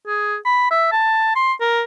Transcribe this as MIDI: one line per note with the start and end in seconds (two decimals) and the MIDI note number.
0.07 0.35 68
0.45 0.69 83
0.71 0.87 76
0.92 1.33 81
1.35 1.53 84
1.60 1.83 70